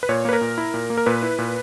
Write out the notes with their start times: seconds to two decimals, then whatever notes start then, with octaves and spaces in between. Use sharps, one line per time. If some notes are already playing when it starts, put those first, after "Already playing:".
0.03 B4
0.09 A#2 C#5
0.25 A#3 B4
0.33 A#4
0.41 A#2
0.58 E4
0.74 A#2
0.90 A#3
0.97 A#4
1.06 A#2 B4
1.22 E4
1.39 A#2